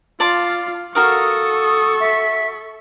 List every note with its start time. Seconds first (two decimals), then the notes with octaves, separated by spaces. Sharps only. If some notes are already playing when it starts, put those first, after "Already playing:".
0.20 F4 D5 F5 A5 C6
0.95 F#4 A4 A#4 F5 C#6 D#6
2.00 E5